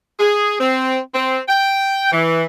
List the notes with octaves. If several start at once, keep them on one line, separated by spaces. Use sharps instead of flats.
G#4
C4
C4
G5
E3